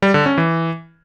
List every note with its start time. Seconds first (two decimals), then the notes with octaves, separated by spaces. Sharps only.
0.02 G3
0.14 D3
0.26 C#4
0.38 E3